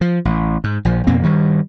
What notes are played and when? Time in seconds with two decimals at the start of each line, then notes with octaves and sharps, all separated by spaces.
0.01 F3
0.25 A1
0.64 G#2
0.85 A#1 F3
1.07 F2 B2 A#3 C4
1.23 G2 D#3 G3